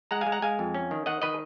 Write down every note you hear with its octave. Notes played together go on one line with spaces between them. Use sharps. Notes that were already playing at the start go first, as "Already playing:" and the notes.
G#3 F#5 A#5
F5 G#5
G#3
F#5 A#5
G#3 F5 G#5
F2
C#4
D#3
D#3 D#5 F#5
D#3 B4 D#5